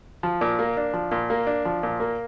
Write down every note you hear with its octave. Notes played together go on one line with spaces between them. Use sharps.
F3
A#2
A#3
D4
F3
A#2
A#3
D4
F3
A#2
A#3